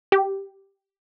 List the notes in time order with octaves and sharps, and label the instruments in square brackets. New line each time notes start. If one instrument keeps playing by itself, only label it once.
[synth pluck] G4